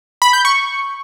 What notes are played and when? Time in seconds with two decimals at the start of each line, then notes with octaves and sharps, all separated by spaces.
0.22 B5
0.33 G6
0.45 C#6